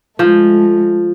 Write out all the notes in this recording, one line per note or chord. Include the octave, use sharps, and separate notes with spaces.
F3 G#3 A3